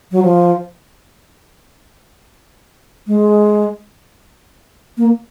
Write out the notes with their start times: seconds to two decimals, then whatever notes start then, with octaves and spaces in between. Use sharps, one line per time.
0.12 F#3
0.23 F3
3.07 G#3
4.97 A#3